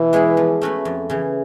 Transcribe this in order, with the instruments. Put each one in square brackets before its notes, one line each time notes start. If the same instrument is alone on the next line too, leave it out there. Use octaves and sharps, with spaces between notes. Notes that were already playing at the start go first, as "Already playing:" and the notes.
Already playing: [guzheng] B2 [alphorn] E3
[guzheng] G#3 B3 E4 G#4
F3
A3 C#4 F#4 B4
F2
C#3 E3